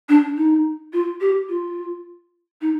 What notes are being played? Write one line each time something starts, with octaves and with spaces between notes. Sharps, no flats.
D4
D#4
F4
G4
F4
D#4